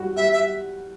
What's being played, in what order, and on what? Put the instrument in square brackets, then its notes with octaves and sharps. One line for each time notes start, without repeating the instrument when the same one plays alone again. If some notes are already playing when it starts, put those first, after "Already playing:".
Already playing: [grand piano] G3 F#4
[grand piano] G3 [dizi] E5
[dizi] E5